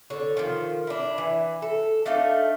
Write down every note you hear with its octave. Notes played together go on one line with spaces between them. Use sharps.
D3 C#5
D#3 F3
D4 E4
E3
A4
A3 D4 D#4 F5